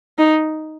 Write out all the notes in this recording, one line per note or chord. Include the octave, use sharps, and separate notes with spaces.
D#4